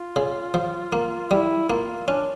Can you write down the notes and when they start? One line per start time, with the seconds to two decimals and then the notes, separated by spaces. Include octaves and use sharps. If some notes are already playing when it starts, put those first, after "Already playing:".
Already playing: F4
0.16 C#3
0.54 F3
0.93 A#3
1.31 G3 E4
1.69 A#3 F4
2.08 C#4 D4